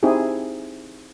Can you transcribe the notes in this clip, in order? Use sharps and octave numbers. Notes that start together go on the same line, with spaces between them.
C4 D#4 E4 G4 G#4